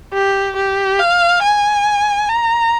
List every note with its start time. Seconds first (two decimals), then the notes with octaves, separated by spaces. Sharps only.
0.13 G4
0.56 G4
0.99 F5
1.42 G#5
2.28 A#5